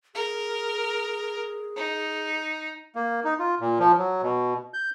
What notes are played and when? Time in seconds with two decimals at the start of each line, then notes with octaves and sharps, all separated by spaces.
0.15 G#4 A#4
1.77 D#4
2.96 A#3
3.25 D#4
3.39 F4
3.60 A#2
3.79 F3
3.98 F#3
4.22 B2
4.74 G6